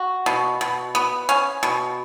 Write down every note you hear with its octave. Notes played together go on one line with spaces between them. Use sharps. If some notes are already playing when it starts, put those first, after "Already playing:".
Already playing: F#4
B2
B2
B3
C#4
B2